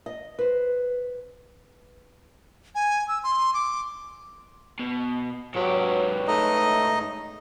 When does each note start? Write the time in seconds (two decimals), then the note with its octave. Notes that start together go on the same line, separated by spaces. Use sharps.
0.06 D#5
0.39 B4 C5
2.75 G#5
3.08 E6
3.23 C6
3.54 D6
4.79 B2
5.55 G#2 F#3 G4 B4 C#5
6.28 A3 D#4 D#5